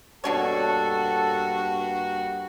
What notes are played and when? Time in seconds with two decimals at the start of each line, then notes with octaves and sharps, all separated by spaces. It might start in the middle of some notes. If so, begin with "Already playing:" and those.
0.24 G2 B2 A#3 D4 F#4 A4 C#5